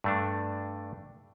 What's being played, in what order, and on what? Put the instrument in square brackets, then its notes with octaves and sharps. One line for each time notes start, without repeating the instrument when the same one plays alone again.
[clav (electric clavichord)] G2 A3 D4